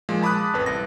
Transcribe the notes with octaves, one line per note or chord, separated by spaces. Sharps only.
A#2 F3 G#3
A5 B5 D6 D#6 F#6
A1 F2 B4
C2 A#6